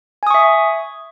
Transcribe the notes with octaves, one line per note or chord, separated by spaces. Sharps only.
E5 G#5 C#6 D#6